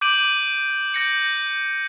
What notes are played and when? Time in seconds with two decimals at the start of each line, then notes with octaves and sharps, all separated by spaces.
0.01 D6 G6 D7 D#7 F#7
0.94 G6 A#6 C#7